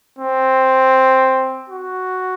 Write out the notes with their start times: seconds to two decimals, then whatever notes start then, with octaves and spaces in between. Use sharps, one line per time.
0.19 C4
1.69 F#4